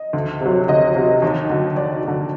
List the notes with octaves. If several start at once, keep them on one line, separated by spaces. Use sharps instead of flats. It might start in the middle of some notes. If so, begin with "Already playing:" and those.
Already playing: D#5
D2
C3 F#3
D2 D#5
C3 F#3
D#2
D3 F#3
D#2 D5
D3 F#3